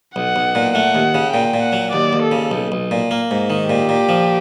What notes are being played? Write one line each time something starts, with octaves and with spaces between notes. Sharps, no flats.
B1 F#5
B1
A#2
A3 F#5
D#2
C#3
A#2 G5
A#2
F#5
F#3
D#2 D5
D#2
A4
C#3
B1
B1
A#2
A#3
G#2
D#3
A#2 G4
A#2
F3